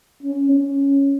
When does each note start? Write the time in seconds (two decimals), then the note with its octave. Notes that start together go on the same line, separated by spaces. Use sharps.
0.23 C#4
0.52 C#4